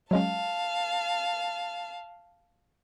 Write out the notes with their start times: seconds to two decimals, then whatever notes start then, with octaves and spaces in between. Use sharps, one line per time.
0.11 F#3 G#3 C#4 F5 A5